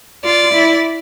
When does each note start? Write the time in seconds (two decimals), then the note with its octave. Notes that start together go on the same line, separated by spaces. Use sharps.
0.25 F4 D5
0.53 E4